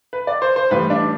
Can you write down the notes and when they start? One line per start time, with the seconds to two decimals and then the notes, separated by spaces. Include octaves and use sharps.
0.13 B4
0.27 D5
0.42 C5
0.56 C5
0.71 A2 E3 G3 B4
0.90 D4